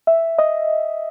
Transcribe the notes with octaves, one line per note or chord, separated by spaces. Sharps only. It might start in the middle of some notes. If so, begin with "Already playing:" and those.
E5
D#5